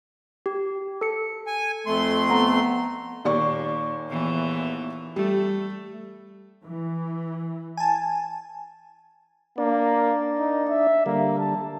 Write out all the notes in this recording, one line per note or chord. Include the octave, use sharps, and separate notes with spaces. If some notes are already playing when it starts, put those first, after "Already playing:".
G4
A4 C#7
G#5
F2 A3 C6
B3 A#5
D#2 A#2 D5 C#6
E2 A#2 E3
G3 A3
E3
G#5 A5
A#3 D4 D5
D#4
E5
D3 G3 A#3
A5